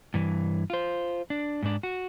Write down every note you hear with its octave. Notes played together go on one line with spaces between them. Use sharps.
G2 E3
F4 C5
D4
G#2 D4
F#4